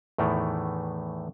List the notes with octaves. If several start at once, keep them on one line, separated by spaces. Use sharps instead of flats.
E2 A2 D#3 E3 A3